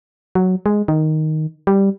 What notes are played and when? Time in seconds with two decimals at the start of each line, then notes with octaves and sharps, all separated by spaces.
0.35 F#3
0.66 G#3
0.88 D#3
1.67 G3